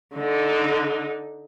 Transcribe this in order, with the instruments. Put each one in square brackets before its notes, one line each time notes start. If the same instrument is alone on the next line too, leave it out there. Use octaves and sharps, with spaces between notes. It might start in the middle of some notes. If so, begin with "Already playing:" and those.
[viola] D3 D#4